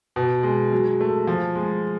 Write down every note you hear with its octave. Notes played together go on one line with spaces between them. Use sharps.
B2
G#3
F#3
A3
F3
G#3